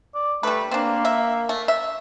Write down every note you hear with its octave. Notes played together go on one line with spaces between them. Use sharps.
D5
G3 A3 B4
A#3 C4 D4
E5
A3
E5